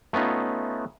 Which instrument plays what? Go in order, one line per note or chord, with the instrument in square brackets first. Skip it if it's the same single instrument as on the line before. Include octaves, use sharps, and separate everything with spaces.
[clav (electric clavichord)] A3 B3 C#4 D#4 F4